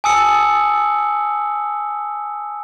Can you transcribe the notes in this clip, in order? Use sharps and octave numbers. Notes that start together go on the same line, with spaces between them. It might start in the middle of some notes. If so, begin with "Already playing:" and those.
G#5 A5 D#6 E6 C#7